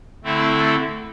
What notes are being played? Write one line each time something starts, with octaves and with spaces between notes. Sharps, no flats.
D3 A3 C4 E4 A4